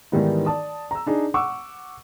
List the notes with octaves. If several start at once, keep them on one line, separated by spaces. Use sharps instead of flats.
G#2 D#3 E3 G3 B3 D#4
D5 A5 D#6
A#5 E6
D4 D#4 G#4
F#5 C#6 D6 E6